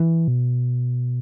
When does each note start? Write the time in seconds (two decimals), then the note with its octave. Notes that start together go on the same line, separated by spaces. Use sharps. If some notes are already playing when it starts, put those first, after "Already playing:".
Already playing: E3
0.28 B2